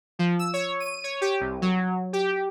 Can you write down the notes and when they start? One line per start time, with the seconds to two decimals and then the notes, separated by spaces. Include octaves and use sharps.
0.19 F3
0.39 E6
0.53 C#5
0.80 D#7
1.04 C#5
1.21 G4
1.40 C2
1.62 F#3
2.13 G4